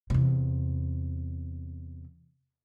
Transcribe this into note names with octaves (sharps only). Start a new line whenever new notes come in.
E2 C3